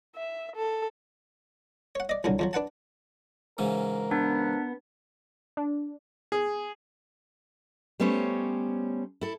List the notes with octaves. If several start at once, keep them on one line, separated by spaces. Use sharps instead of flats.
E5
A4
C#5 F#5
D5 D#5
C2 A#2 D3 F#3
F2 F3 F#3
D4 B4 F#5 A5
G#2 C#3 E3 A#4
B3 D4
D4
G#4
G3 A3 B3 C#4 C5 C#5
E4 A4